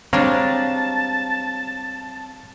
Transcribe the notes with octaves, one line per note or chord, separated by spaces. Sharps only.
G3 G#3 C4 D4 C#5 F5 A5 A#5